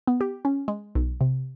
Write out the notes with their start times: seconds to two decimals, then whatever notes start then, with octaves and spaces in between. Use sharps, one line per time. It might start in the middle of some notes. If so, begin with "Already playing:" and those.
0.07 B3
0.21 G4
0.45 C#4
0.68 G#3
0.95 B1
1.21 C3